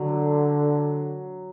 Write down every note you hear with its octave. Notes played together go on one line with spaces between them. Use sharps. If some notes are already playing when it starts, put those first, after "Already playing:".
Already playing: D3 F#3